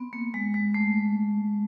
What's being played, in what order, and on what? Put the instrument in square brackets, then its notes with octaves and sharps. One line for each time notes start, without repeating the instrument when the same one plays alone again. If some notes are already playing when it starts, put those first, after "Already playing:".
Already playing: [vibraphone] B3 C4
A#3
G#3
G#3
A3